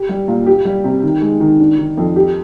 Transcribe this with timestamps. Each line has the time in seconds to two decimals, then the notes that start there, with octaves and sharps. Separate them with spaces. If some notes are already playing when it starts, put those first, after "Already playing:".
Already playing: G4
0.09 G3
0.28 A#2
0.46 G4
0.65 G3
0.84 C3
1.03 D#3
1.22 G#3
1.40 D#3
1.60 D4
1.78 D#3
1.97 F2
2.16 G4